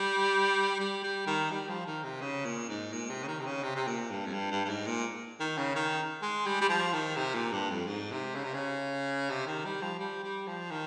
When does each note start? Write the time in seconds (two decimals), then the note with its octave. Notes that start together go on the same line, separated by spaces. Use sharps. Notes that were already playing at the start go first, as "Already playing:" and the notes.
Already playing: G3
0.80 G3
1.03 G3
1.27 D#3
1.51 G3
1.69 F3
1.86 D#3
2.04 C3
2.21 C#3
2.45 A#2
2.69 G#2
2.92 A#2
3.10 C3
3.23 C#3
3.27 D#3
3.40 C3
3.46 C#3
3.63 C3
3.76 C3
3.87 A#2
4.10 G2
4.26 F2
4.33 G2
4.51 G2
4.65 G2
4.69 G#2
4.87 A#2
5.40 D#3
5.58 C#3
5.76 D#3
6.22 G#3
6.46 G3
6.61 G3
6.69 F3
6.93 D#3
7.17 C3
7.34 A#2
7.52 G2
7.70 F2
7.87 G#2
8.12 C3
8.35 C#3
8.44 C3
8.54 C#3
9.30 C3
9.47 D#3
9.65 G3
9.82 F3
9.99 G3
10.23 G3
10.47 F3
10.71 D#3